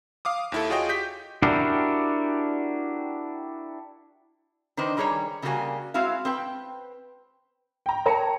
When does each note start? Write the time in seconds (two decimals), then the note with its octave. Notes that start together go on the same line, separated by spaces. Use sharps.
0.25 F5 D6 D#6
0.52 D#2 E4 A4
0.70 F4 F#4 G#4 C#5 D#5 G5
0.89 G4 G6 B6
1.42 D4 E4 F#4 G4 A#4
4.77 D#3 D4 B4 C5 D#5
4.97 D#3 G3 G#4 C#5 A#5
5.42 C#3 E3 G3 A#3 F#4 G#5
5.94 G#3 C4 E4 F#4 F5
6.25 C4 B4 G5
7.86 G5 A#5
8.06 A#4 C#5 G5 A5 A#5